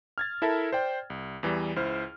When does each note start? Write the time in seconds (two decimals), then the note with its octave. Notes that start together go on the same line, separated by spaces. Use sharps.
0.18 F6 G#6 A6
0.42 E4 A4 A#4 E5 A5
0.72 C5 D5 G5
1.10 C2
1.43 E2 E3 G3
1.76 C#2 E4 C5 F6